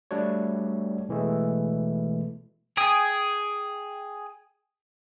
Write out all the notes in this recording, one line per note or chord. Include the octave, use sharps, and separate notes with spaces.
G3 A3 D4 F#4 C#5
B2 E3 G#3 A3
G#4 G5 G#5 D#6